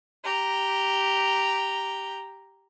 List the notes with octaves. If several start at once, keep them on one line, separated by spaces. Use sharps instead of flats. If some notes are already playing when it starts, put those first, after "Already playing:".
G4 A#5